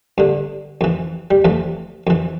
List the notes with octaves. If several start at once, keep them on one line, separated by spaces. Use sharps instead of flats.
G2 D3
F2 E3
G3
F2 E3 A3
F2 E3